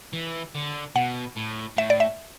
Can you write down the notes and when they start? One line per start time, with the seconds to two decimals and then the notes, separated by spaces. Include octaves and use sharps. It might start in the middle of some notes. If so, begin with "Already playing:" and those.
0.13 E3
0.55 D3
0.96 B2 F#5
1.37 A2
1.78 A2 E5
1.90 D5
2.00 E5